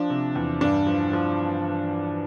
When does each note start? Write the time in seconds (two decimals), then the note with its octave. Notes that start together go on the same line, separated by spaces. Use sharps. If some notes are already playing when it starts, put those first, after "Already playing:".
Already playing: F3 D4
0.10 C3
0.36 E2
0.61 G2 D4
0.87 F3
1.13 F3